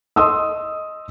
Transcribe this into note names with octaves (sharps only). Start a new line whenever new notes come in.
D#5 C6 D#6 E6